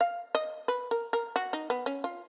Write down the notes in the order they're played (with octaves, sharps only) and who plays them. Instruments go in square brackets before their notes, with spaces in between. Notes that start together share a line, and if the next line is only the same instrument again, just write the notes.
[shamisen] F5
D#5
B4
A#4
A#4
F#4
D#4
B3
C#4
F4